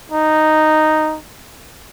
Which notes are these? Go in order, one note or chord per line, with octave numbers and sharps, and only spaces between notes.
D#4